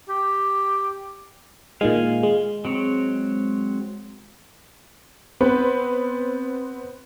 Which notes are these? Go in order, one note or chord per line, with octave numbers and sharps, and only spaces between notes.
G4
A#2 D#3 G#3 F5 G#5
G#3
F#3 C4 C#5
B3 C4 B4 C5